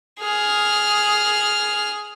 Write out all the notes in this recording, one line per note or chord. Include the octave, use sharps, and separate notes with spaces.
G#4 F6